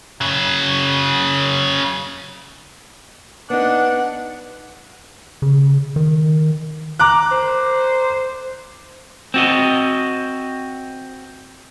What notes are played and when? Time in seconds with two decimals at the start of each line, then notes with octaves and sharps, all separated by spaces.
0.21 C#3 F#3
3.50 B3 D4 D#4 F#5
5.42 C#3
5.96 D#3
7.00 A#5 D6 F#6
7.31 C5
9.34 C4 F#4 D#5